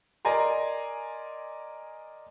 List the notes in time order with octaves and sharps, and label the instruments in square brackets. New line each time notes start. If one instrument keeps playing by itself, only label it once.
[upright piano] A#4 D5 D#5 G#5 A#5 C6